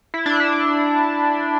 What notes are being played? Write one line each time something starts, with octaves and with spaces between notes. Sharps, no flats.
E4
D4
E4